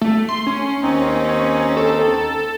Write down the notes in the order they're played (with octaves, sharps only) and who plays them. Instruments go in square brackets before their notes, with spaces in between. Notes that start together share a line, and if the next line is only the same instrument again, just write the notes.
[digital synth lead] A3
C6
C#4
[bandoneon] D#2 C4 D#4
[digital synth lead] A4